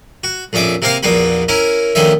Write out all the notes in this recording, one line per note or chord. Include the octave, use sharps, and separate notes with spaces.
F#4
A#1 F2 C#4 E5 D6
C3 A#3 C4 A#4 F5
A#1 E2 A#3 B3 F#4 B5
C#4 E4 A#4
D2 D#3 F3 C#4 E5